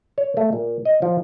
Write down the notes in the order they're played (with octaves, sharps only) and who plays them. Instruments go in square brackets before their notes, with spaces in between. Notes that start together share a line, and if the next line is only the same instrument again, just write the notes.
[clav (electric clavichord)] C#5
A3
A#2
D#5
F3